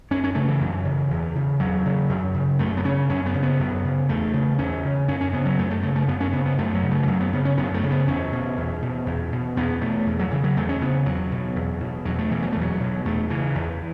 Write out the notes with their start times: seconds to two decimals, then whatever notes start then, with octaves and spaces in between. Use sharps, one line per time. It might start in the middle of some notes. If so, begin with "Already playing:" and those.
0.11 F#2 C#4
0.24 C#4
0.35 C#3 A3
0.48 E3
0.61 F#2
0.85 C#3
1.11 E2
1.36 C#3
1.60 E2 F#3
1.86 C#3
2.09 F#2
2.34 C#3
2.59 F#2 A3
2.77 B3
2.85 C#3 C#4
3.09 F#2 C#4
3.26 B3
3.34 C#3
3.43 B3
3.59 F#2
3.84 C#3
4.09 E2 A3
4.34 C#3
4.58 E2 C#4
4.84 C#3
5.08 F#2 C#4
5.21 C#4
5.33 C#3 B3
5.45 F#3
5.59 F#2 A3
5.71 A3
5.83 C#3 A3
5.96 A3
6.08 F#2 B3
6.21 C#4
6.33 C#3 B3
6.46 B3
6.58 F#2 A3
6.75 F#3
6.83 C#3
6.91 A3
7.03 E3
7.07 F#2 F#3
7.20 B3
7.33 C#3 B3
7.45 C#4
7.57 F#2 B3
7.74 A3
7.83 C#3
7.91 B3
8.07 E2 C#4
8.32 B2
8.57 E2
8.82 B2
9.06 E2
9.32 B2
9.56 E2 B3
9.81 B2 A3
10.07 E2
10.20 F#3
10.31 C#3 E3
10.44 F#3
10.57 E2 A3
10.69 C#4
10.81 C#3 B3
11.06 E2 F#3
11.32 B2
11.56 E2
11.80 B2
12.05 E2 F#3
12.18 A3
12.31 B2 E3
12.43 F#3
12.53 A3
12.56 E2
12.61 F#3
12.80 B2
13.05 E2 A3
13.30 C#3 E3
13.55 E2